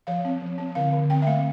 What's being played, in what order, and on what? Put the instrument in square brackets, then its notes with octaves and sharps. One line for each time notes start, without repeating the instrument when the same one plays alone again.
[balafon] F3 F5
C4
F3
C4
D3 F5
D3
C4 G5
E5
A3 F5